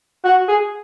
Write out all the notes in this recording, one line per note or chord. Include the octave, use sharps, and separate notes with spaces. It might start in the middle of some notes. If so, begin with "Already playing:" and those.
F#4
G#4